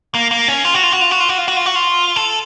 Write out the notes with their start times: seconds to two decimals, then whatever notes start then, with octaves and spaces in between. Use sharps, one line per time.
0.14 A#3
0.31 A#3
0.48 C#4
0.65 F4
0.74 F#4
0.83 F4
0.92 F#4
1.01 F4
1.11 F#4
1.20 F4
1.29 F#4
1.38 F4
1.48 F#4
1.57 F4
1.66 F#4
1.75 F4
2.16 A4